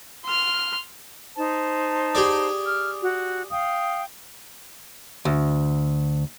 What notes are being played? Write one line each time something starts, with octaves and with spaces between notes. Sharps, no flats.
C6 F6
D#4 C5 A5
G4 G#4 D5
F6
F#4
F5 G5 D#6
D2